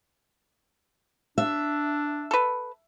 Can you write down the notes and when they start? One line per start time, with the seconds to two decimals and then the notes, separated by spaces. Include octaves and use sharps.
1.38 D4 E5
2.31 A4 B4